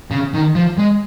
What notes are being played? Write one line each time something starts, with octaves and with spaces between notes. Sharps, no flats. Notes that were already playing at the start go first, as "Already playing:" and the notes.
C#3
D#3
F3
G#3